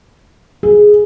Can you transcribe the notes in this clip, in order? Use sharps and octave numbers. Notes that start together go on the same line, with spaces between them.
G#4